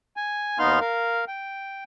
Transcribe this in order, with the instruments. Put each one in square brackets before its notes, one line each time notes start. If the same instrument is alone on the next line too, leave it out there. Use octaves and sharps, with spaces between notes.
[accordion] G#5
D#2 B3 D#4 F5 C6 F6
A#4 F5
G5